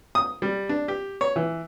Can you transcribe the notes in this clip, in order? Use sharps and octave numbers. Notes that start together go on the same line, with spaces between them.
D#6
G3
D4
G4
C#5
E3